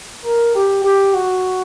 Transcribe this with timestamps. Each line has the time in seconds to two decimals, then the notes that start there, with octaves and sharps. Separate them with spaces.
0.24 A#4
0.55 G4
0.84 G4
1.14 F#4